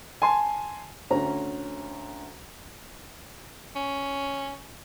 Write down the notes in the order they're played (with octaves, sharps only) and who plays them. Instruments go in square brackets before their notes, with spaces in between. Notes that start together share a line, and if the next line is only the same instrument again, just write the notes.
[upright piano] G#5 A5 C6
D2 C#4 A#5
[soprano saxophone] C#4